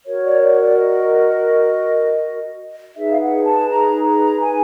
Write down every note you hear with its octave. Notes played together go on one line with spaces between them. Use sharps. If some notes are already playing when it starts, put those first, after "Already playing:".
F#4 A#4 C#5
D5
D5
C#5
D5
D#5
D#4 G#4 B4 E5
F5
F#5
A5
A#5
A#5
G#5